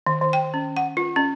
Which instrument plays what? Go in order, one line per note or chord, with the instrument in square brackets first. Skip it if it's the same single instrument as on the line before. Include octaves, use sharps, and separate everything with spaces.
[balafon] D#3
D#3
G5
C#4
F#5
F4
C#4